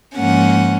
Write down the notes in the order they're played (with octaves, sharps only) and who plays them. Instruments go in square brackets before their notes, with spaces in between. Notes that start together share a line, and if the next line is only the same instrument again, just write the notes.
[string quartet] G#2 F3 A#3 C#4 F#5